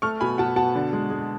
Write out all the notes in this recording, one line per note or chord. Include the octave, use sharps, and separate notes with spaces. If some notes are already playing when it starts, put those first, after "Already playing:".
A3 C#6 F6
B2 G#5 B5
B2 F#5 A5
B2 F#5 A5
D3
G#3
G#3